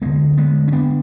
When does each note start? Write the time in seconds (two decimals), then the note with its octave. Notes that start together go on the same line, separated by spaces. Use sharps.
0.02 D2 D3 G#3 B3
0.38 G#3 B3
0.68 C#4
0.72 B3 D4